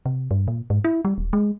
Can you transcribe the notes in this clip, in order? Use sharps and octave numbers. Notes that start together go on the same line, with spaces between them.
C3
G2
A#2
G#2
E4
G3
D#1
G#3